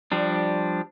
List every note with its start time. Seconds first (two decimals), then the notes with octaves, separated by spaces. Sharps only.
0.12 F3 G3 D4